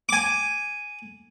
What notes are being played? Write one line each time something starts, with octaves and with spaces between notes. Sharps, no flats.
G#5 D6